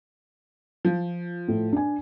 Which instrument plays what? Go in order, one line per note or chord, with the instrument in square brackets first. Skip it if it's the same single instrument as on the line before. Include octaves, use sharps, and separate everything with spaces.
[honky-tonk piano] F3
[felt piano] A2
D4 G#5